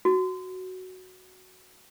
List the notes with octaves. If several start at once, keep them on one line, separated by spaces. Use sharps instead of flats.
F#4